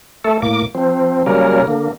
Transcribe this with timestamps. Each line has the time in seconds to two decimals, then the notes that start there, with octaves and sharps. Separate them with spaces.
0.24 A3 A4
0.42 A2 A#3 D6
0.75 F3 C4
1.26 C#3 F#3 G3 A#3 C#4 A#4
1.67 D3 A#3